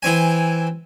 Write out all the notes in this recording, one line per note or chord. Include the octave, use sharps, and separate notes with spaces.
E3 C4 G#5